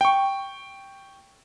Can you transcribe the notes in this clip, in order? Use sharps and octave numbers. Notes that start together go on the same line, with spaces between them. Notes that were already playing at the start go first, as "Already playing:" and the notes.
G5 C#6